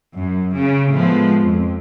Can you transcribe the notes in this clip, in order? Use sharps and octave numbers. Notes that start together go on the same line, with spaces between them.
F#2
C#3
A2 F3 G#3 B3
F2